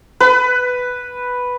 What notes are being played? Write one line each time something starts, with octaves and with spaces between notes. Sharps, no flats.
B4